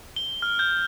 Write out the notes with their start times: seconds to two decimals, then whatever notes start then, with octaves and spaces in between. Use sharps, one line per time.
0.16 G7
0.42 F6
0.59 G6